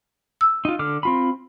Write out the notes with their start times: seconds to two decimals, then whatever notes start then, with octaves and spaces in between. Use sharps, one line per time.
0.41 E6
0.65 D#4 F4
0.79 D3 D6 F6
1.03 C4 F4 B5